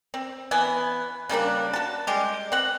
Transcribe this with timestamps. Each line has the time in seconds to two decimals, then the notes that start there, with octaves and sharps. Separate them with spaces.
0.14 C4
0.51 E3 B3 G#5
1.29 C#3 G3 A#3 D4
1.73 F#4 A5
2.07 G3 G#3 G4
2.52 C4 F#5